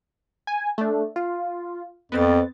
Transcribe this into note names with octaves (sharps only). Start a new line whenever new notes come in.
G#5
A3 D4
F4
F2 B3 C4 A6